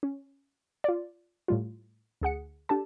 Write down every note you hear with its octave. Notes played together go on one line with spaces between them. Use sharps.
C#4
F4 D5
A2 G3 F4
D2 G#4 F#5 C#7
D4 G4 A4 A5